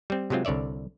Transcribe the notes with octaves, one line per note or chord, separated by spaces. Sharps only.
G3 C4
C3 F#3 G#3 C4 F4
C2 D3 C#5 D5 E5